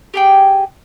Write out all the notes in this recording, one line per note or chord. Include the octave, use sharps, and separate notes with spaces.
G4 G#4 G5